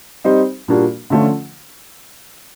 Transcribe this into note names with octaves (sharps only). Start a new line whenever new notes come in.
G3 C4 D#4 G4 C5
A#2 G3 A#3 D4 F#4
D3 F3 A3 C#4 F4